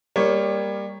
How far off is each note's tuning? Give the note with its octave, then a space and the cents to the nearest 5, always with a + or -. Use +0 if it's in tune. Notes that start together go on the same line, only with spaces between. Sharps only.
G3 +20 A#3 +0 C#5 +0